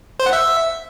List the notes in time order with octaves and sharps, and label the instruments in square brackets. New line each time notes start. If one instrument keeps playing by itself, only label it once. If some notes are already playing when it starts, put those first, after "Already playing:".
[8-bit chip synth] C5
F#5
E5